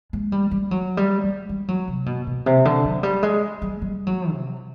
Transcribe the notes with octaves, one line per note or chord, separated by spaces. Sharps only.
G#3
G3
G3
F#3
G3
G3
G3
F#3
C3
B2
B2
C3
D3
F#3
G3
G#3
G3
G3
F#3
C3